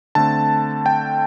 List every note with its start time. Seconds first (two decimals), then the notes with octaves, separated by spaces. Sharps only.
0.15 D3 A3 C4 A5
0.86 G5